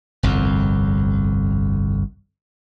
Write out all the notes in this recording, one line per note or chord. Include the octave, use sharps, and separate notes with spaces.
G1 C2 F2